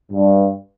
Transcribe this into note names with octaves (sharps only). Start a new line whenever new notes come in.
G2